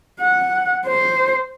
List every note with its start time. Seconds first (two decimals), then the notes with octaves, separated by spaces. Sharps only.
0.20 F#5
0.87 C5